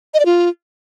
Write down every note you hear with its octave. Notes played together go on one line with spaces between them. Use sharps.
D#5
D5
F4